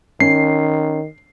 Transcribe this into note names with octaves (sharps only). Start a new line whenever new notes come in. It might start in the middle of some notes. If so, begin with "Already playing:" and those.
D#3 C#4 C7